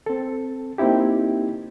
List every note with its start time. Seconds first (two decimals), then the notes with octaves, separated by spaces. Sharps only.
0.06 C4 A4
0.78 A#3 C4 D#4 E4 G4